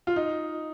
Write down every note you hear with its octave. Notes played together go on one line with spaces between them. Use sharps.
F4
D#4